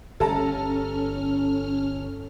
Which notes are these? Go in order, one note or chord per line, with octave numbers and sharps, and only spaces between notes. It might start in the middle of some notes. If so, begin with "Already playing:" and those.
G1 C#4 A4 A5 A#5 F6